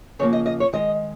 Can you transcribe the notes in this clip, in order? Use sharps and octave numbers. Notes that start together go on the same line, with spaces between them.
C#3 F3 A#3 C#5
D#5
D#5
C#5
D#3 G#3 D#5